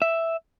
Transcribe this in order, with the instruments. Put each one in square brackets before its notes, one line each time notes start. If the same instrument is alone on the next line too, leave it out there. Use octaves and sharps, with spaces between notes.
[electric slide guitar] E5